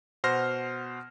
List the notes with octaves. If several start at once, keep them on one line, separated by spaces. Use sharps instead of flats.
B2 C5 F#5 C6 F6 A#6